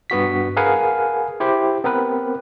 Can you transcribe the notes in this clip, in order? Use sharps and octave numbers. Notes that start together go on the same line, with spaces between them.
G2 B3 F#4 B6
G#4 A#4 B4 F5 F#5 G#5
E4 G4 C5
B3 C4 A#4 B4